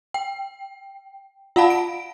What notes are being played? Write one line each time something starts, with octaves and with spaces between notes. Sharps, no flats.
G5
F4 F5 F#5 A5 B5
D7